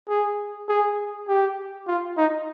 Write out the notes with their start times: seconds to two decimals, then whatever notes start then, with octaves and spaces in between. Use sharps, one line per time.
0.09 G#4
0.69 G#4
1.28 G4
1.87 F4
2.17 D#4